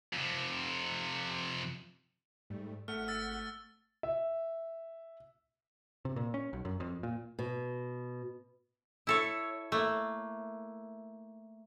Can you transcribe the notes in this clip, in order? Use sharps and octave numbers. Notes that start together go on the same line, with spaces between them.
F2 C3
G#2 G3 A3
G#1 A3 F#5 F6 B6
E6 A6
E5
C3
A#2
C#4
B1
F#2
F2
A#2
B2
E4 A4 C#5
A3 A#3